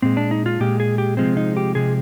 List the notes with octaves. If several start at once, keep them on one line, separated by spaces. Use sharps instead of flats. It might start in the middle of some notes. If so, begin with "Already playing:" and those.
A#2 G#3 C4
D4
D#4
F4
A#2 G#3 G4
G#4
G4
C3 F3 G#3 C4
D#4
G4
C3 F3 G#3 G#4